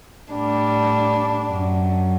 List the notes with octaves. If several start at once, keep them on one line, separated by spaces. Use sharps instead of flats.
A2 G3 D4
F#2 F#3